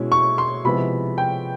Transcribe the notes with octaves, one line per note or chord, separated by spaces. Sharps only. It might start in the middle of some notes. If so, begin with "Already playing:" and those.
Already playing: B2 G#3 C#4 E4
C#6
C6
C3 F3 G#3 B3 E4 B5
G5